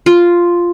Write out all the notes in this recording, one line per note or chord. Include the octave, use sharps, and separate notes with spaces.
F4